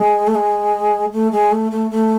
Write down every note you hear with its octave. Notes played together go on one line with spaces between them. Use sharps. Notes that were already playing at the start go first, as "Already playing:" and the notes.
Already playing: G#3
A3
G#3
A3
G#3
A3
A3
A3